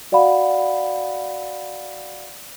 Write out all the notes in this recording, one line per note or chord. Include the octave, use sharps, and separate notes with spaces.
F#4 D5 F5 F#5 B5